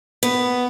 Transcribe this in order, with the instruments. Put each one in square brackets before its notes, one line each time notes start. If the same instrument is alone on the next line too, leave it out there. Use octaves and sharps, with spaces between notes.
[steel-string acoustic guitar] B3